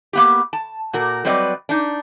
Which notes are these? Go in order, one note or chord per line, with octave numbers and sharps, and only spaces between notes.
A#3 B3 G4
A5
A#2 F#4 A#4
F#3 G3 C4 B4 D5 D#5
D4 D#4